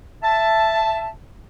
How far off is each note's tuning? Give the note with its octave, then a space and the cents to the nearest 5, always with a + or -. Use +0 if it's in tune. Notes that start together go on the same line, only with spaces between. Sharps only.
E5 +15 A5 +0